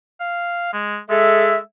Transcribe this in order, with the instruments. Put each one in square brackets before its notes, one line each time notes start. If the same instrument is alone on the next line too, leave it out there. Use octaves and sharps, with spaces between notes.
[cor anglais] F5
G#3
[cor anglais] G#3 [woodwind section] G#4 A4 E5